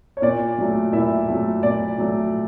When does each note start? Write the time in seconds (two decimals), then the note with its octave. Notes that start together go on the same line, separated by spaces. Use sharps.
0.17 C#5
0.22 A#2 D5
0.58 F#3 A3
0.93 A#2 E4 E5
1.29 F#3 A3
1.63 A#2 D5
1.98 F#3 A3